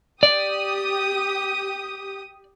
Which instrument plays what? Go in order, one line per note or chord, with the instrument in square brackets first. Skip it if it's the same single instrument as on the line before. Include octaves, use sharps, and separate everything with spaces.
[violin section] G4 D#6 [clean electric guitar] D5